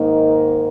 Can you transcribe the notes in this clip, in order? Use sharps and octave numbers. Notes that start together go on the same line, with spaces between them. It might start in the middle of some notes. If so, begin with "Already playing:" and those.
Already playing: G#2 D#3 A#3 D#4